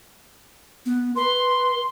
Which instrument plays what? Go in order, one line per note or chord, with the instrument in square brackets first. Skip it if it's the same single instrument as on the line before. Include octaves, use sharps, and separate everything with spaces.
[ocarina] B3
[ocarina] B4 [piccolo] C6